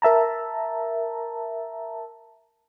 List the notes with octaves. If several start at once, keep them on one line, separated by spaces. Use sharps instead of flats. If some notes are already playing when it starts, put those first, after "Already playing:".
A#4 E5 A5 A#5